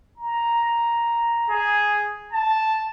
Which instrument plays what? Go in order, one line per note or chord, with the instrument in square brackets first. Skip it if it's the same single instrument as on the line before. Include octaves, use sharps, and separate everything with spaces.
[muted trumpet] A#5
[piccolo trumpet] G#4
A5